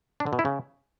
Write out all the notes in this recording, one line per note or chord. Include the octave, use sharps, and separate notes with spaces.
D4
D3
B2
E4
C#3